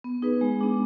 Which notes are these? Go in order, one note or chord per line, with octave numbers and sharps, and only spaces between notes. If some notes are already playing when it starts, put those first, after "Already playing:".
B3
D#4 G#4 B4
G#3
B3 D4